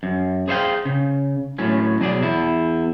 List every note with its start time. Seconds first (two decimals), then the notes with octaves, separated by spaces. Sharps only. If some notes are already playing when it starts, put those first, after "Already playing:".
0.03 F#2
0.48 G#4 C5 C#5 E5 F5 G5
0.85 C#3
1.58 A2 F#3 C#4
2.00 B2 F#3 G#4 D5
2.22 E2 E4